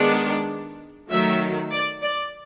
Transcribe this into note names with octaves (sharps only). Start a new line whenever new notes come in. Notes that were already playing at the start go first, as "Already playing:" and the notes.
Already playing: D#3 G#3 B3 D4
D#3 F#3 A3 E5
D5
D5